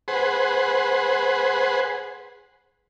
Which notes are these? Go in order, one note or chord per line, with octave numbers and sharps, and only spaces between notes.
G#4 B4 C5 F#5